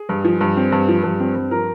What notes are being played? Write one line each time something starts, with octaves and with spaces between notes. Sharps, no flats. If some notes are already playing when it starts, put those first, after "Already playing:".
Already playing: G#4
G2
F3
G2
C4
G2
F3
G2
C4
G2
F3 A#4